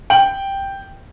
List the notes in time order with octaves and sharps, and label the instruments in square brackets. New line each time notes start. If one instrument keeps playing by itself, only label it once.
[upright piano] G5 F#7